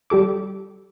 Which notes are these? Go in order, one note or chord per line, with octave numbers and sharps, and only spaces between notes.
G3 G4 A4 D6